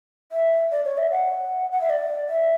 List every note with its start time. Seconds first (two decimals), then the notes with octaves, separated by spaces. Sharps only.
0.32 E5
0.72 D5
0.85 C#5
0.98 E5
1.11 F#5
1.72 F#5
1.81 E5
1.90 D5
2.29 E5